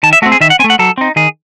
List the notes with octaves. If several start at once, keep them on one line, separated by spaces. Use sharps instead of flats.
D#3 A5
E5
A3 C4 F#4
G#4
D#3 E5
F#5
C4 G#5
A3
F#5
F#3 A4
C4 D#4
D#3 G#4